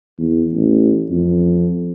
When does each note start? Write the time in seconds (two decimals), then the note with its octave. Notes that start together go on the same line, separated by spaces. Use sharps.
0.19 E2
0.54 A1
1.10 F2